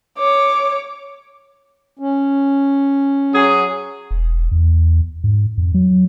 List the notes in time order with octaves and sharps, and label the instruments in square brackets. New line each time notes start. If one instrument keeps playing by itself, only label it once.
[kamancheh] C#5 D6
[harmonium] C#4
[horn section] F#3 G#4
[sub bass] E1
E2
G#2
F2
F#3